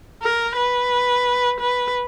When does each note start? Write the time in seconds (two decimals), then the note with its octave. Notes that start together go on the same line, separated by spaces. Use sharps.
0.23 A#4
0.56 B4
1.60 B4